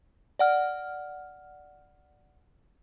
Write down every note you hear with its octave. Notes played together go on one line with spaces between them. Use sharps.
D5 F#5 F6